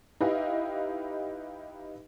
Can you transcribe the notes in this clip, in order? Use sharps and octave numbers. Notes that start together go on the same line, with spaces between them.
D#4 E4 G4 B4 D#5 F5